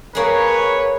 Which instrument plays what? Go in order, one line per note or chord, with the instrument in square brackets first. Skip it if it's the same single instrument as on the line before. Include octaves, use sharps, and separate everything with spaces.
[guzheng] A#3 G#4 [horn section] B4 C#5